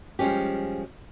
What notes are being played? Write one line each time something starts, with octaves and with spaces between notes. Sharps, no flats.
F3 G3 G#3 C#4 G4